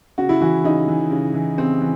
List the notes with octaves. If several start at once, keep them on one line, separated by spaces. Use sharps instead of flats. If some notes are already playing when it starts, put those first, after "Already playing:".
C#3 F#4
E4
E3 F#4
C#3 D#4
E3
C#3
E3
C#3 C4
E3